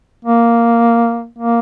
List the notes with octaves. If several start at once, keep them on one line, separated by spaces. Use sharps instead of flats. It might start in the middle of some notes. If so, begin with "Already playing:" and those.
A#3
A#3